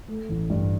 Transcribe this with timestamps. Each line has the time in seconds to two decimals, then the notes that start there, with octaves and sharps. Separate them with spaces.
0.08 A3
0.29 A1
0.50 G2